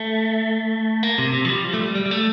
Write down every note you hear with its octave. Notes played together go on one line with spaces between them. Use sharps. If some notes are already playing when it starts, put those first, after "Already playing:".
Already playing: A3
A#3
C3
C3
F3
G3
F3
A3
G3
G3
G3
A3